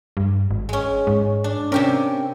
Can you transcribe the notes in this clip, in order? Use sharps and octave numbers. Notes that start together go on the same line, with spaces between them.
G2
G#1
G#3 C#4
G#2
D4
C3 C#4 G4 A#4